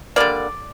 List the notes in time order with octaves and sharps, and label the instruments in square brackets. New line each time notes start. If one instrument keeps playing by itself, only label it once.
[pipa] D3 G3 A#3 D5